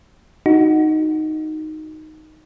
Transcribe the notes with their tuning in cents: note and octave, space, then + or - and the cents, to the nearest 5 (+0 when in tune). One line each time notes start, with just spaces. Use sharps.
D#4 +0 F#4 +0